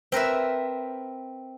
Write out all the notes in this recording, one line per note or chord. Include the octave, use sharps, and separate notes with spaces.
C4 A#4 B4 E5